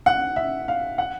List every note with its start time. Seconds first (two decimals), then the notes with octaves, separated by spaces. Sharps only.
0.06 F#5
0.36 E5
0.68 F5
0.98 F#5